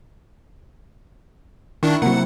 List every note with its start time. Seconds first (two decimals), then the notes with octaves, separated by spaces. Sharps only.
1.83 D#3 D4 E4 C#6
2.02 C3 F#3 A#3 C4 F#5